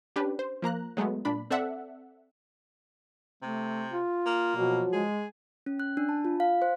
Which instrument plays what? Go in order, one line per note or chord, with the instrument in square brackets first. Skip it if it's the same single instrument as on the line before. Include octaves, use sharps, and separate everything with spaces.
[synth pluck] C#4 D4 G4 B4
C5
F3 A#3 A#5 F#6
F#3 G#3 A3 B3
A#2 D4 B5
C4 A4 D5 E5 F#5
[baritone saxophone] C3 [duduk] A3
[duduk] F4
[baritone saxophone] A#3
[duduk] B2 [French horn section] F3 F#3 F#4
[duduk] G#3 [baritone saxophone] G#4
[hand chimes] C#4
F#6
D4
A5
F4
F5
C5